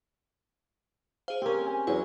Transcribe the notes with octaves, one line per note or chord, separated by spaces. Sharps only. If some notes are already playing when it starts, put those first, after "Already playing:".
G#4 C5 F5
C4 C#4 G4 A#4
G#5
E2 F#3 C#5